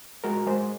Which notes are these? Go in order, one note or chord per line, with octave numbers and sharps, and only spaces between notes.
G#3 F#4 A#4
G#3 G#4 C5